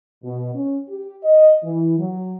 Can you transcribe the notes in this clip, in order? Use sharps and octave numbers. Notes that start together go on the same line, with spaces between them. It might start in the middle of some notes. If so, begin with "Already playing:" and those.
B2
C#4
G4
D#5
E3
F#3